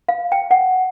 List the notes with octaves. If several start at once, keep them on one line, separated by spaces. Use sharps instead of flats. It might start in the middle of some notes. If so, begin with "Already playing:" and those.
F5
G5
F#5